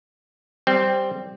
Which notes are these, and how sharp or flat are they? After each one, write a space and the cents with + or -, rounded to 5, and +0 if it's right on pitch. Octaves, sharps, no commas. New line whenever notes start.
G3 +0 C4 +0